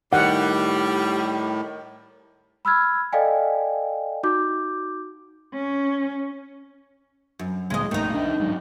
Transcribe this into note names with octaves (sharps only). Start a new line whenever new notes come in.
A2 D#3 G3 F#5
B5 E6 F6 G#6
A4 D5 D#5 F5 G5 G#5
D#4 F#4 D6 G6
C#4
F#2
D1 D2 A#2 G#3 D#5
A#1 F#2 A2 D#3 D#4
C2 D4
G1 G#2 F#3